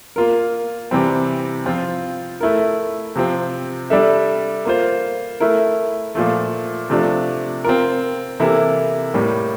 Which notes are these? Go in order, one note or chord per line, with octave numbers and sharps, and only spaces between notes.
A#3 F4 A#4
C3 E3 G3 C4
F3 C4 F4
A3 E4 A#4
C3 F3 C4
G3 D4 A4 E5
A#3 F4 C5
A3 E4 A#4
A#2 F3 A3
C3 F3 A3 D4
C4 F4 A#4
C3 E3 A#3 E4 A4
A2 G3 A#3